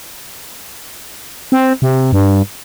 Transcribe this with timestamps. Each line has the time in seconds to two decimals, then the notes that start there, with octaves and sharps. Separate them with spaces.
1.52 C4
1.82 C3
2.13 G2